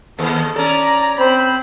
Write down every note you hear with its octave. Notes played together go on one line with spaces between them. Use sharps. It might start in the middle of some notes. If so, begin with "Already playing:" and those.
D#2 A4
C#4 A4 D5 A#5
C4 C5 B5